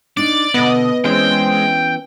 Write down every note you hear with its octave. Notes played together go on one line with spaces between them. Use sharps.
D4 D#4 D5 A6
B2 D3 B3 D#5
E3 G#3 C4 C#4 C#5 G5